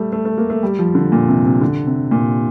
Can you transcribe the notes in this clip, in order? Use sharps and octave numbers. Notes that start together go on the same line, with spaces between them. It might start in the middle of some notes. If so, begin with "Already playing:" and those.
Already playing: G3 A3
A3
A3
A#3
A3
G3
F3
D3
A#2
C3
C3
D3
C3
A#2